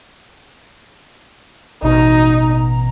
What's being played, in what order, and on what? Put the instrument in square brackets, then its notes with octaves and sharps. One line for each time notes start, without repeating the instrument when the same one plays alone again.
[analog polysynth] A1 B2 A#5 [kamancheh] D#4